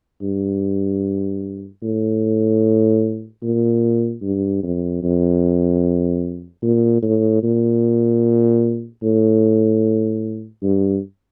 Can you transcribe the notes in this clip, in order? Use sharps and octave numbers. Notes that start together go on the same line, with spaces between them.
G2
A2
A#2
G2
F2
F2
A#2
A2
A#2
A2
G2